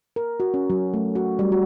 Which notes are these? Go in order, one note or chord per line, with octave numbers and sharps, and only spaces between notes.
A#4
F#4
C#4
F#3
A3
F#4
G3
F#4